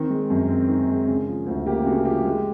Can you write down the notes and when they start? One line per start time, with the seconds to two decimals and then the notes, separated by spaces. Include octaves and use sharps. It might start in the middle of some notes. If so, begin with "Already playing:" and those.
Already playing: D#3 C4
0.10 G#3
0.30 F#2
0.49 C4
0.68 D#3
0.88 G#3
1.07 C#3
1.27 F3
1.46 D2
1.66 A#3 G4
1.86 C#3 F#4
2.05 F3 G4
2.25 G#3